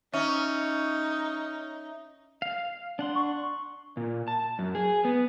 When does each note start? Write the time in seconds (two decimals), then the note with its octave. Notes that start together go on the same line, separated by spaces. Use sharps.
0.13 C#4 D#4 E5
2.42 F5
2.99 D4 F#5 C6
3.15 C#6
3.97 A#2
4.28 A5
4.59 F#2
4.75 G#4
5.05 B3